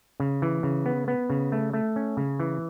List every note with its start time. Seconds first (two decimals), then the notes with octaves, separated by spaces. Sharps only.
0.20 C#3
0.42 E3
0.63 C#3
0.86 B3
1.08 B3
1.30 C#3
1.52 A3
1.73 A3
1.96 C#4
2.17 C#3
2.40 E3